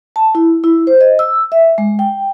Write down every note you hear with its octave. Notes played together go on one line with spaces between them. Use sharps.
A5
E4
E4
C5
D#5
E6
E5
G#3
G5